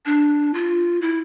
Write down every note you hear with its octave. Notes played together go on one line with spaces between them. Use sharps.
D4
F4
E4